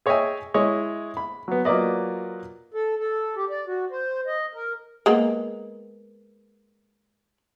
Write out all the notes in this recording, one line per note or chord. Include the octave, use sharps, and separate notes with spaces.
G#4 C#5 D#5 E5 G5 G#5
G#3 E4 G#4 C#5 D#5
B5
F#3 B3
F#3 A#3 F4 B4 D5 D#5
A4
A4
G4
D5
F#4
C5
D#5
A#4
G#3 A#3 B3